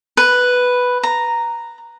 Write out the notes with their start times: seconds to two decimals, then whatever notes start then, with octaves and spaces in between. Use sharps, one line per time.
0.17 B4
1.03 A#5